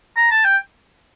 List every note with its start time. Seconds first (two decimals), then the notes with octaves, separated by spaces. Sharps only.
0.17 A#5
0.31 A5
0.45 G5